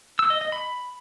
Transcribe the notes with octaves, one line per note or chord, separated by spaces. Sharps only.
E6
D#5
D#5
B5